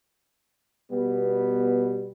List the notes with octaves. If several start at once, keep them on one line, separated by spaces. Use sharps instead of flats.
B2 G3 B3